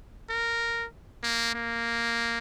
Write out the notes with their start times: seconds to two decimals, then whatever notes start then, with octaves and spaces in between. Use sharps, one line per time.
0.30 A#4
1.23 A#3
1.55 A#3